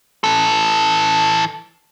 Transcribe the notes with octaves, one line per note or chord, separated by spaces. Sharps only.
E3 A4